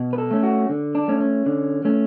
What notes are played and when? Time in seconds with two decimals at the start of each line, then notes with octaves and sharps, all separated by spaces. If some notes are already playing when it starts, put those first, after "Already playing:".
Already playing: B2
0.13 B4
0.18 A4
0.31 A3 C#4
0.43 F#4
0.69 D3
0.95 D4
1.08 A3 C#4
1.20 C#4
1.46 D3
1.85 A3 C#4